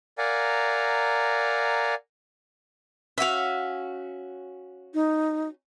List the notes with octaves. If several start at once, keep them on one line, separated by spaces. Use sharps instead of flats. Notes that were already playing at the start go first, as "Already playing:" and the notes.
A#4 D5 F5 F#5 G#5 A#5
C#4 F#4 E5 F5
D#4